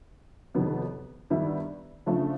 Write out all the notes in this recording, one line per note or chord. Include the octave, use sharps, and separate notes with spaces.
F2 C3 D#3 F#3 B3
G2 D#3 G3 B3 E4
C#3 F3 A3 D4 F4